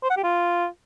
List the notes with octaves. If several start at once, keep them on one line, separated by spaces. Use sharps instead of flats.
C5
F#5
G4
F4